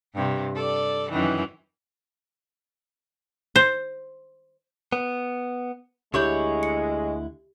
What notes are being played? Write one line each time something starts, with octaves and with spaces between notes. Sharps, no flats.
G2 C3
A4 D5
F#2 D#3 E3
C5
B3
D2 D3 G#3 E4 G4 C#5 C#6 G6
C#7